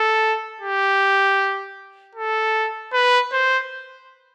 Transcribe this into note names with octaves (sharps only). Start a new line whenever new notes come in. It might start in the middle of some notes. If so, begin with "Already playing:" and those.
Already playing: A4
G4
A4
B4
C5